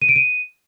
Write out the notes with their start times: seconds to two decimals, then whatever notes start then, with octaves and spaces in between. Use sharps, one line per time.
0.02 D#7
0.09 D7
0.16 D#7